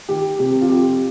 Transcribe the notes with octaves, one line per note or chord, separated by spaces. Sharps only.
D#3 G4
C3 G4
F4
F2 G4